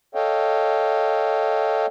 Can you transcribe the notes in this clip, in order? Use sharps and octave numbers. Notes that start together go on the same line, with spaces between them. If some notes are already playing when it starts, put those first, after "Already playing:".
A4 C#5 D#5 F5 G5